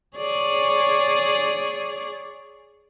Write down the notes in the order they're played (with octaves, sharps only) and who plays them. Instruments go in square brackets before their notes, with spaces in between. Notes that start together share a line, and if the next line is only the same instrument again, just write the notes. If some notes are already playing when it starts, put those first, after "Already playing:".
[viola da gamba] G#4 C#5 D5